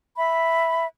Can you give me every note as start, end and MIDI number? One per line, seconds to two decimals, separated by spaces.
0.17 0.85 76
0.17 0.85 83